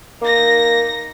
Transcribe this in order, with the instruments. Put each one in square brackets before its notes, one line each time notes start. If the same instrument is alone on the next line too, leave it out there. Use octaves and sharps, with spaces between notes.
[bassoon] A#3 [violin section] D#4 A#6